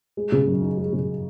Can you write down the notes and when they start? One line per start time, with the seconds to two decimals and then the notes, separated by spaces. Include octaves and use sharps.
0.17 G#3
0.32 C#3
0.47 F#2
0.62 D#4
0.77 G#3
0.93 C#3